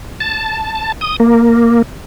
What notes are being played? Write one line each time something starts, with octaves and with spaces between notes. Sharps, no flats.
A5
D#6
A#3